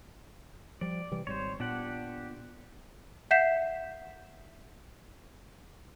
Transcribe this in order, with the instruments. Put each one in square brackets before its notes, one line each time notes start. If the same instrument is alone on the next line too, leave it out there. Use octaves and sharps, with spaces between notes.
[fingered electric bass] F3 G3 [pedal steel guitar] D5
[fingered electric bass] C3 E3 G3
[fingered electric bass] G#1 G3 [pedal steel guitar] C5 C#5
[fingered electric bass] A#2 B3 [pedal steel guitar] D4 G4 F#5
[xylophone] E5 F#5 G6 B6 C7 E7